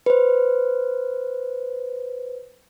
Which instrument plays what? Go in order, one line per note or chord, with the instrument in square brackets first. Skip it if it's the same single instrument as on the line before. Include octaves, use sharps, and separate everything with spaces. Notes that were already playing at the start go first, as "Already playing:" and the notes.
[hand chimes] B4 C5